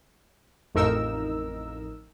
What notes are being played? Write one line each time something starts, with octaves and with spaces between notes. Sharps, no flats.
A1 F2 D#4 A#4 E6